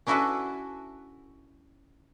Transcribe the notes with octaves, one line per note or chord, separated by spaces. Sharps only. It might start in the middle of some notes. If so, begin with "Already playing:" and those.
C#4 D4 E4 F#4 A4 B4